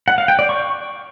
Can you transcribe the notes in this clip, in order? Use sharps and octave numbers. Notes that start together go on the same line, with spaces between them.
F#5
F5
G5
D5
C#6